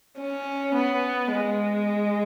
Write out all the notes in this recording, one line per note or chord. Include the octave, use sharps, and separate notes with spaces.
C#4
B3
G#3